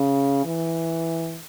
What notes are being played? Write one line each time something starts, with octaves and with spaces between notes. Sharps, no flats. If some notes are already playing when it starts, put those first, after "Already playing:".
Already playing: C#3
E3